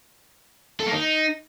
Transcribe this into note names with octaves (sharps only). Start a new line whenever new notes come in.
A4
A#3
D#4